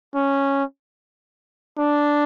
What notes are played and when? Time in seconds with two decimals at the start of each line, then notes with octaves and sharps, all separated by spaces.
0.15 C#4
1.78 D4